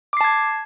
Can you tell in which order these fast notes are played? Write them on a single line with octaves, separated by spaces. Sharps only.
D6 C7 A5 G#6